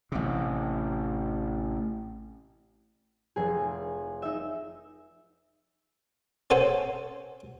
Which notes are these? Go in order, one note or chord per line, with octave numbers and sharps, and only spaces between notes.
A1 C3
F1 G#4
D#4 E5
C#4 A4 C5 F#5 G#5